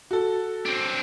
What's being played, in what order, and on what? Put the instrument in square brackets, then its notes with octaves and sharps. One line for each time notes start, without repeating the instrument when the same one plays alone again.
[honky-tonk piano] F#4 A4
[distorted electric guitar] C4 D4